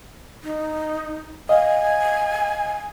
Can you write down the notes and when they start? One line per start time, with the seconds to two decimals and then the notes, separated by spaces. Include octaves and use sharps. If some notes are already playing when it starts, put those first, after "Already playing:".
0.44 D#4
1.49 D#5 F5 G#5